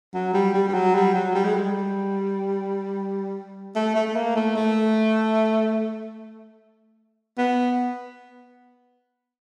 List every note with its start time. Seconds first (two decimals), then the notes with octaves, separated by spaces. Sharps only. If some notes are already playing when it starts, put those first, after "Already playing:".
0.14 F#3
0.34 G3
0.54 G3
0.69 G3
0.74 F#3
0.95 G3
1.14 F#3
1.35 G3
1.45 G#3
1.54 G3
3.76 A3
3.95 A3
4.08 A3
4.16 A#3
4.36 A3
4.56 A3
7.38 B3